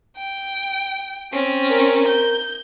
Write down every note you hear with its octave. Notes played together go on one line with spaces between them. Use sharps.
G5
C4 C#4
A#4
G6